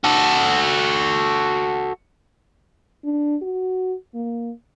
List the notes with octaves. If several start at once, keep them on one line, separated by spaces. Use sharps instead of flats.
F#4 A4
D4
F#4
A#3